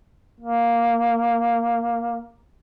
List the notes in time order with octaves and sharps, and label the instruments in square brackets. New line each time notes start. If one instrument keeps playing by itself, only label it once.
[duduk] A#3